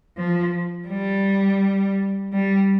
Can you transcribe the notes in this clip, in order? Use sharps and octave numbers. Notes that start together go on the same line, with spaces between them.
F3
G3
G3